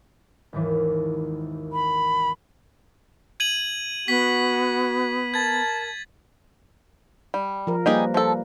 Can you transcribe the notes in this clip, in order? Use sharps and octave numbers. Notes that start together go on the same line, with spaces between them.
G#1 D#2 E3
B5
G#6 D#7 F#7
B3 F#4 B6
A#4 A5 G#6 A6
G3
F3 A#4
G3 A#3 D#4 G4 G#4 B4
F3 A4